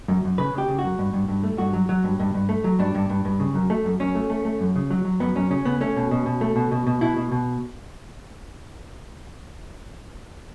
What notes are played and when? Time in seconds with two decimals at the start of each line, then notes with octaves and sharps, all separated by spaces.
0.08 F#2
0.24 F#2
0.38 C#3 B4
0.54 C#3 G4
0.68 C#3
0.79 F#2 F#4
0.99 G2
1.13 G2
1.28 G2
1.44 A3
1.58 G2 F#4
1.73 F#3
1.89 F#3
2.04 G2
2.20 G2
2.34 G2
2.49 A3
2.64 F#3
2.79 G2 D4
2.95 G2
3.10 G2
3.25 G2
3.40 C#3
3.54 F#2
3.70 A3
3.85 F#2
4.00 F#2 C#4
4.15 A3
4.30 A3
4.45 A3
4.61 F#2
4.76 C#3
4.90 F#3
5.05 F#3
5.20 F#2 B3
5.35 F#2 C#4
5.51 C#3 C#4
5.65 C#3 B3
5.81 A3 C#4
5.96 B2
6.11 B2
6.26 B2
6.41 A3
6.56 B2
6.71 B2
6.87 B2
7.01 B2 E4
7.16 B2
7.31 B2